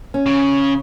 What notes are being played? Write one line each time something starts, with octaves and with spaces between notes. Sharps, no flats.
C#4
C#3